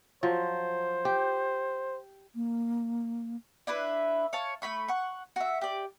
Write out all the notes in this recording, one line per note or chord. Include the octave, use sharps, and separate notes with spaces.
F3 F#3 C5
G4
A#3
D4 E4 B4 E5
C#5 F5 A5
A3 A#3 B5 C#6
F#5 C#6
F#4 E5
G4 D5